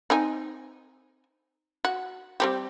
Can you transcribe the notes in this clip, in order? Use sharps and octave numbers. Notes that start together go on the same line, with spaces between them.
C4 D#4 G#5
F#4
G3 C4 G4